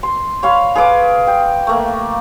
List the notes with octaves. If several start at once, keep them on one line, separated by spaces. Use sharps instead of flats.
C6
C#5 F5 B5 C6
G#4 B4 F5 D6
G5
A3 A#3